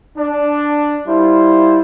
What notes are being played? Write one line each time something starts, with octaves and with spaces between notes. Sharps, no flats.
D4
G3 E4 F4 C5